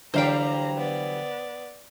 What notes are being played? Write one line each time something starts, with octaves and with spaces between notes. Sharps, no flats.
D3 E3 F#3 G3 C5 F5 G5 A#5
B3 D5